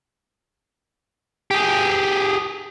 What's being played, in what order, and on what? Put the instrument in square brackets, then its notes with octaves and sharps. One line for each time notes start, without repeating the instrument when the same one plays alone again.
[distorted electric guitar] G4 G#4